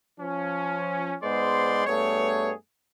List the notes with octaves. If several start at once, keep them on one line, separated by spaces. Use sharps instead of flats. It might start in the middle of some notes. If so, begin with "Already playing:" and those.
F3 C#4
G#2 G#3 B3 C5 D5 C6
G2 A3 B3 G#4 C#5